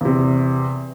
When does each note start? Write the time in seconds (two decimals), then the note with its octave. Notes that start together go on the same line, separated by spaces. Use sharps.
0.01 E2 C3